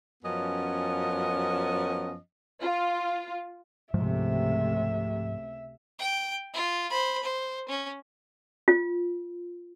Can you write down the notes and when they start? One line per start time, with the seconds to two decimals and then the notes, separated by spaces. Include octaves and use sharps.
0.24 F#2 F3 B3 C#4 D#5
2.62 F4
3.94 C#2 G#2 C3 F3 G#3 A3 E5
5.99 G5
6.54 F4
6.90 C5 B5
7.23 C5
7.69 C#4
8.68 F4